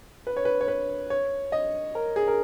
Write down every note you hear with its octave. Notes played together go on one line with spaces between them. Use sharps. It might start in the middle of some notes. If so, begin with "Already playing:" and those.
B4
C#5
B4
C#5
B4
C#5
D#5
A#4
G#4
A#4